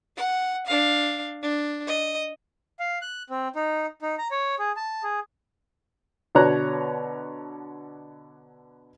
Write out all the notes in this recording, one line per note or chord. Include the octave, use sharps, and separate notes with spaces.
F#5
D4 F5
D4
D#5
F5
F#6
C4
D#4
D#4
A#5
C#5
G#4
A5
G#4
B2 D3 B4 C#5 A#5 F#6